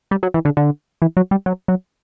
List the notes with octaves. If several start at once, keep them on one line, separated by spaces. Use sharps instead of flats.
G3
F#3
E3
D3
D3
E3
F#3
G3
F#3
F#3